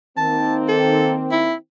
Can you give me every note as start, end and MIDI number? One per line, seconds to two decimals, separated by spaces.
0.17 1.54 51
0.17 1.54 58
0.17 1.54 60
0.17 0.55 81
0.69 1.13 69
1.31 1.54 64